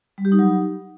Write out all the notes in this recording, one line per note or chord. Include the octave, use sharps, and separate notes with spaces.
G3
G4
D#4
F#3